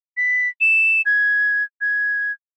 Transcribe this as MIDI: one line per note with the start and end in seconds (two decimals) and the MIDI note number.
0.17 0.48 95
0.61 1.01 100
1.05 1.63 92
1.81 2.32 92